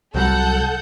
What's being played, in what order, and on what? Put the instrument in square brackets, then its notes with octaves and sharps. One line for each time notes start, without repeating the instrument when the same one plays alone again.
[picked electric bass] C2 F#3 G3 [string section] A4 F#5 G6